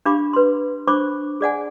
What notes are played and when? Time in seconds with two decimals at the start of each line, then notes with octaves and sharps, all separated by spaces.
0.06 D4 G4 F5 B5 D6
0.33 B4 C6
0.87 D4 C5 B5 C#6 D6
1.41 G#4 D5 F#5 G#5